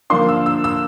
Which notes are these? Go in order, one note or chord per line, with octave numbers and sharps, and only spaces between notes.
D3 F3 A#3 D4 C6
E6
E6
E6